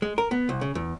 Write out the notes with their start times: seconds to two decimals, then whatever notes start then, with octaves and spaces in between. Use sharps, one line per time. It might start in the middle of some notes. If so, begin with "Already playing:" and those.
0.02 G#3
0.18 A#4
0.31 B3
0.49 C2
0.61 C#3
0.75 E2